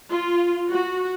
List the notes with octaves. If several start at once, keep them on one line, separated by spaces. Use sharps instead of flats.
F4
F#4